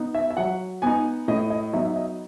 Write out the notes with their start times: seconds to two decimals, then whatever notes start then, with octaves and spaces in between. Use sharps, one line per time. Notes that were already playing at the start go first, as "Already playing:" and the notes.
Already playing: B3 D#4
0.15 E5
0.30 E5
0.37 F#3 F#5
0.82 B3 D#4 G#5
1.28 A2 D#5
1.50 D#5
1.73 F#3 B3 D#4 E5
1.85 E5
1.96 D#5